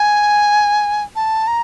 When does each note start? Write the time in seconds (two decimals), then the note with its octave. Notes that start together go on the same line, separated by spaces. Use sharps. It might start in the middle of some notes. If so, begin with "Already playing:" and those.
Already playing: G#5
1.16 A5
1.47 A#5